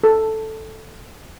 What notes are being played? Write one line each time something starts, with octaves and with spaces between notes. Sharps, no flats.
A4